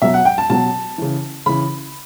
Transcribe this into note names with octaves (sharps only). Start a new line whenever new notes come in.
B2 F#3 E5
F#5
G5
A5
B2 F#3 A5
C#3 E3
C#3 E3 B5